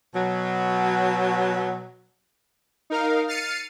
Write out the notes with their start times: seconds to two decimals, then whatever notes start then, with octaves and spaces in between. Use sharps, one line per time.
0.15 B2 F#3
2.90 D#4 A#4 F5
3.28 F6 A6 C7 C#7 D#7